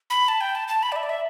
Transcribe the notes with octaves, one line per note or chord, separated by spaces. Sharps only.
B5
A5
G5
A5
A5
B5
D5
E5
D5
E5